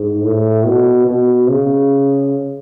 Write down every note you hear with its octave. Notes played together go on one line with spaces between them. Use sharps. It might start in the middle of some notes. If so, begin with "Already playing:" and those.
Already playing: G#2
A2
B2
B2
C#3